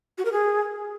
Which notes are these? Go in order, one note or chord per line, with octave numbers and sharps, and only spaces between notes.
F#4
A#4
G#4